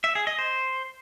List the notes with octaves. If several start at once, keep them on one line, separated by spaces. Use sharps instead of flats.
E5
G#4
D#5
C5